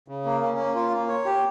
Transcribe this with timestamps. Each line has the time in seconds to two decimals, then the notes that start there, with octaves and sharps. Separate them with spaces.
0.08 C#3
0.25 A#3
0.42 C#4
0.59 A#3
0.75 F4
0.92 A#3
1.09 C#5
1.26 G4